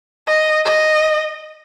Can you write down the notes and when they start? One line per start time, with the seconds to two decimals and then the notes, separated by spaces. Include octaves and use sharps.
0.27 D#5
0.65 D#5